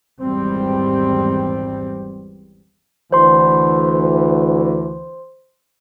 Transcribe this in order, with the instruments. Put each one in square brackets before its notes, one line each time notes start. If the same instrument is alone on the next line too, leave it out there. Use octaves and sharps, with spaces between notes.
[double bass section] G#1 E2 G3 C4
[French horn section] D2 E3 [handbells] C5 C6